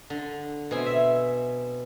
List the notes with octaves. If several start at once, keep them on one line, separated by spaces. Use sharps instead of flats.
D3
B2 C4 G#5
E5